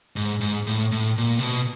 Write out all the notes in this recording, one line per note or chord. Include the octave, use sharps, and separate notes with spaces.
G#2
G#2
A2
A2
A#2
C3
B2